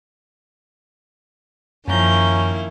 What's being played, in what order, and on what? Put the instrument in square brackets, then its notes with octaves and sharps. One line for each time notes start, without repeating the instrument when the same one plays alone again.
[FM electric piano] F#2 [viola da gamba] D#3 A#3 E4 [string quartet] F3 A#5 G6 [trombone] C#4